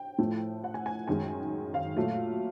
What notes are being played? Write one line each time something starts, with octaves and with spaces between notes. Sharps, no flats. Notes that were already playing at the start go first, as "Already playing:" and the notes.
Already playing: G5
A2 F3 A3
F#5
G#5
G#5
F#2 D#3 G#3 G#5
F5
A#2 F#3 A3